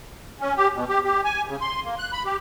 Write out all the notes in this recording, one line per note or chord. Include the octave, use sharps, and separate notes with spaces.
C#4
G4
B2
G4
G4
G#5
C#3
C6
A#3
F#6
B5
G4